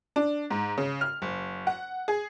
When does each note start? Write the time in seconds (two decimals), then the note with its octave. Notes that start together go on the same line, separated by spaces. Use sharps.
0.16 D4
0.50 G#2
0.78 C#3
1.01 F6
1.22 F#1
1.67 F#5
2.08 G#4